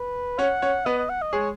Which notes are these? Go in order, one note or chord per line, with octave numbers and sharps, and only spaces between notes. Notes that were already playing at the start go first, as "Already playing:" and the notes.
Already playing: B4
C#4 C#5 F#5
C#4 C#5
B3 B4 D#5
D#5
F#5
D#5
G#3 G#4 C#5